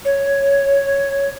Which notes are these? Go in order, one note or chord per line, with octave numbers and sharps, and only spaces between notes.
C#5